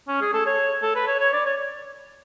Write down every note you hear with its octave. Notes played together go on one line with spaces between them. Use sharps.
C#4
G#4
A4
C#5
A4
B4
C#5
C#5
D5
C#5